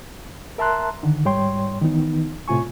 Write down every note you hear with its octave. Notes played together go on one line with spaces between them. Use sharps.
A#4 E5 A5 A#5 C6 F#6
D3 D#3
G#2 G3 C#5 G5 C6
D#3 E3 B3 D#4
A2 C3 F4 G#5 C#6